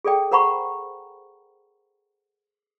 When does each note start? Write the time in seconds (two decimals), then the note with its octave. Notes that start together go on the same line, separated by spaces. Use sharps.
0.05 G#4 A4 D5 G5
0.31 A#4 C5 F#5 A#5 B5 C#6